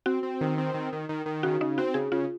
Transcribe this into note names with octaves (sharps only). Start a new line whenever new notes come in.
C4 F#4
C4
D#3
C4
D#3
D#3
D#3
D#3
C#3 F#4
C#3 D#4
C4 F#4
C#3 G#4
C#3 F4